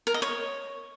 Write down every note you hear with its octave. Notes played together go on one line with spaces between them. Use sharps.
A#4
D#5
C#5